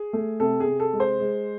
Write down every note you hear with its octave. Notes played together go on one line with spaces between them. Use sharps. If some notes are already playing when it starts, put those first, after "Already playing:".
Already playing: G#4
A3
C3 A4
G#4
C3
A4
G#3
C5
G#3